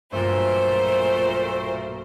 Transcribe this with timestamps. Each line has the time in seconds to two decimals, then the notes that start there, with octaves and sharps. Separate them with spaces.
0.12 B1 G2 A#2 A3 C5